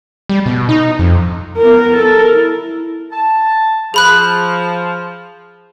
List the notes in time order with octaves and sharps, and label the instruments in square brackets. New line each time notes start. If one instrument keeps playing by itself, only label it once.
[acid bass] G3
B2
D#4
F2
[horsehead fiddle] B3 A#4
A4 A#4
E4
[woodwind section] A5
[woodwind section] F3 [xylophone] G#4 B5 F#6